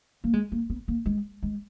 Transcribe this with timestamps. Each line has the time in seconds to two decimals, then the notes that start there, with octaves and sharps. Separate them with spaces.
0.24 A#3
0.33 G#3
0.52 A#3
0.70 B3
0.88 A#3
1.06 G#3
1.43 G#3